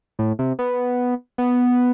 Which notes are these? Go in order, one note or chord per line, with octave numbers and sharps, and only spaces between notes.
A2
C3
B3
B3